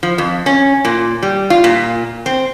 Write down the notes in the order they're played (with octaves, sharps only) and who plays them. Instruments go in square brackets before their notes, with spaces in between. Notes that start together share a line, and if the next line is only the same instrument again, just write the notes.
[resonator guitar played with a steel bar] F3
F2
C#4
A#2
G3
F4
A#2
C4